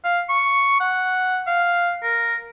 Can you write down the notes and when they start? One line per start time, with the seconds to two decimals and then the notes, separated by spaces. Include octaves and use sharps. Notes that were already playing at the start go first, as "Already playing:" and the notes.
0.04 F5
0.29 C#6
0.80 F#5
1.47 F5
2.03 A#4